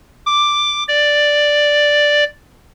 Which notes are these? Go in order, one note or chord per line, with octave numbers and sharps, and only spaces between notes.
D6
D5